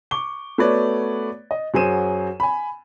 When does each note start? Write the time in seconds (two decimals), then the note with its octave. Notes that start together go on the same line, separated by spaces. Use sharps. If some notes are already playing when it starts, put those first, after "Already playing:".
0.11 C#6 D6 G7
0.58 A3 B3 F#4 B4 C#5 D5
1.51 D#5
1.74 F#2 F#3 G#4 C5 D#7 E7
2.40 G#5 B5